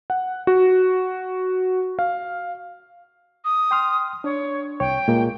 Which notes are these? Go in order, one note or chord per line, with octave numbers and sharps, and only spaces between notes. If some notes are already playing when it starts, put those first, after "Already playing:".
F#5
F#4
F5
D#6
G5 C6 F6
D4 C#5
C2 C#5 G5
A#2 G#3 A#3